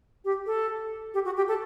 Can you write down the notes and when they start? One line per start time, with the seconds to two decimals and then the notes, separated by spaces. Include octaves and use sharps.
0.25 G4
0.46 A4
1.14 G4
1.25 F#4
1.37 G4
1.48 A4